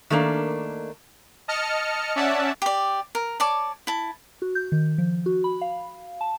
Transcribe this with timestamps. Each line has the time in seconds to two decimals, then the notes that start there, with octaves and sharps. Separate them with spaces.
0.10 D#3 A3 A#3 D4
1.48 D#5 A5 F6 C#7
2.16 C#4 D5 E5 F#5 A5
2.62 G4 D5
3.15 A#4
3.40 C#5 D5 A5 D6
3.87 E4 A5
4.42 F#4
4.55 G6
4.72 D#3
4.98 F3
5.26 F#4
5.44 B5
5.61 F5
6.21 A5